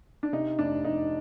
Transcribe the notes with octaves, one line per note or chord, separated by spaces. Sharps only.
D4
C3 D#4
F1 D4
F1 D#4